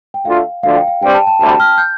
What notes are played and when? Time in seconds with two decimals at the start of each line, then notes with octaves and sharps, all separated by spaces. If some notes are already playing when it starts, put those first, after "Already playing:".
0.14 G5
0.25 D2 D3 A3 F4 F5
0.63 D2 D3 F3 D4 F4 F5
0.76 G5
0.88 F5
1.02 G2 G3 C4 G5
1.14 A5
1.27 A5
1.40 D2 C3 G3 A5
1.60 F6
1.78 G6